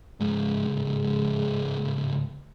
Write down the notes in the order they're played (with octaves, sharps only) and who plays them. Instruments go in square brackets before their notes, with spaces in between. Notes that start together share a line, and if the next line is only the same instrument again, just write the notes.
[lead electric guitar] C#2 G#2 [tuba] G#3